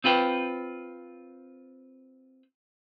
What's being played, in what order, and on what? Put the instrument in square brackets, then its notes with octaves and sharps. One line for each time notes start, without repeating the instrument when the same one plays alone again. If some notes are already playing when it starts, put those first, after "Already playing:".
[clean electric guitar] C4 F4 B4 G5